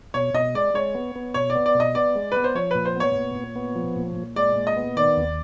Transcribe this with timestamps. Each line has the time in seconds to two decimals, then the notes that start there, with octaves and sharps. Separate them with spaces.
0.14 B2 C#5
0.34 B2 D#5
0.55 G#3 D5
0.74 G#3 C#5
0.95 B3
1.16 B3
1.34 B2 C#5
1.50 D5
1.56 B3
1.66 D5
1.75 B2
1.80 D#5
1.95 B3 D5
2.15 G#3
2.32 B3 B4
2.44 C5
2.55 F3 C#5
2.71 A#2 B4
2.85 C5
2.96 B3 C#5
3.16 A#2
3.35 A#2
3.56 B3
3.76 F3
3.96 A#2
4.16 A#2
4.36 G#3 D5
4.56 A#2
4.67 D#5
4.77 B3
4.97 D#3 D5
5.17 D#2